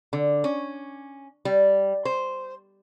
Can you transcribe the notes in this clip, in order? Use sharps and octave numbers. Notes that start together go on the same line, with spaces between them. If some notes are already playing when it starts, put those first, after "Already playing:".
D3
C#4
G3
C5